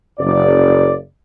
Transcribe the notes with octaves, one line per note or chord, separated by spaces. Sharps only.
F#1 D5